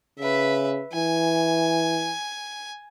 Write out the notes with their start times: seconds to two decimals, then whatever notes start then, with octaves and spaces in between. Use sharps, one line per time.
0.19 C#3 B4 E5
0.93 E3 G#5